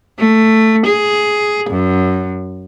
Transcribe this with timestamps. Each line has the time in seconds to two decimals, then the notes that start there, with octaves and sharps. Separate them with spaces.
0.19 A3
0.86 G#4
1.70 F#2